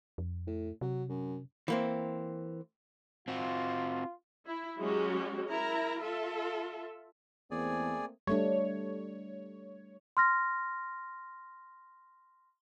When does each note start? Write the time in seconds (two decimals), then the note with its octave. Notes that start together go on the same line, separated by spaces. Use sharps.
0.18 F2
0.47 A2
0.81 C3 F#3
1.09 F#2
1.68 E3 A#3 C4
3.28 C4 F4 F#4
4.47 E4
4.78 F#3 G#3 C#4 F#4 G4
5.48 E4 A#4 A#5
6.03 F4 A4 E5
7.51 E2 A3 A#3 C4 G#4 D5 G#5
8.27 G3 A3 D4 C#5
10.17 C6 F6 A#6